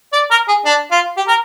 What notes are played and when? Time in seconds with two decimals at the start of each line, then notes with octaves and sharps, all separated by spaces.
0.13 D5
0.31 A#4
0.48 G#4
0.65 D4
0.91 F4
1.17 G4
1.28 A#4